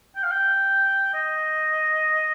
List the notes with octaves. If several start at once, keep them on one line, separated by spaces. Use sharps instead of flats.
G5
F5
G5
D#5